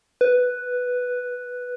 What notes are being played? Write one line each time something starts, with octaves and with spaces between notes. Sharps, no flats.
B4